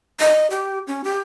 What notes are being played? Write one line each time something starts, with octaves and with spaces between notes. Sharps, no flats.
D#5
G4
C#4
G4